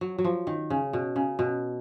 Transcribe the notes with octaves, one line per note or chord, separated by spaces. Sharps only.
F#3
F#3
F3
D#3
C#3
B2
C#3
B2